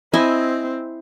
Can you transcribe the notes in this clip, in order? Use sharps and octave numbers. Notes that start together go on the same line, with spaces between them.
C4 E4 D#5 G#5